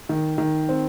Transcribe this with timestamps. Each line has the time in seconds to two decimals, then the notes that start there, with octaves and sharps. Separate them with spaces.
0.09 D#3
0.38 D#3
0.69 C4